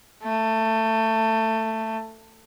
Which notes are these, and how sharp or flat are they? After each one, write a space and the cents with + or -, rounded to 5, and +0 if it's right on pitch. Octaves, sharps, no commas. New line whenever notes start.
A3 +20